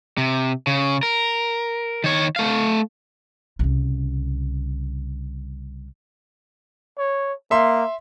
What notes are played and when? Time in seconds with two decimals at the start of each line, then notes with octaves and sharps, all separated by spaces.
0.18 C3
0.67 C#3
1.03 A#4
2.04 D#3 C#5
2.36 A3 F5
3.59 C2 C#3
6.98 C#5
7.51 A#3 E5 C6